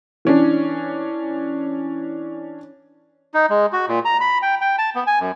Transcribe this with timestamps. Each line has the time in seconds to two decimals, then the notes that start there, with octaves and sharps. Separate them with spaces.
0.25 E3 C#4 D4
3.34 D#4
3.50 G#3
3.73 F#4
3.88 A#2
4.05 A#5
4.21 B5
4.42 G5
4.61 G5
4.78 A5
4.95 B3
5.07 G#5
5.20 F#2